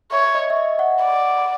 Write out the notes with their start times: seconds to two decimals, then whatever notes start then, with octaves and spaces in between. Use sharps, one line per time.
0.12 C#5 E5
0.35 D#5
0.50 E5
0.57 D#5
0.79 F#5
1.02 D5